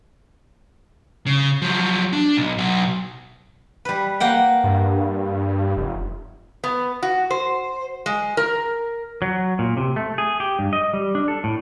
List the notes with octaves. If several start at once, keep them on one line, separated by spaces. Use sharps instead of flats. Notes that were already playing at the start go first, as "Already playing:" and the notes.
C#3
F3 F#3
D4
B1
B2 F#3
G3 B4
A#3 F#5 G5
G2
F1
B3
F#4
C5
G#3
A#4
F#3
A#2
C3
A3
G#4
G4
G2
D#5
G3
D4
A4
A2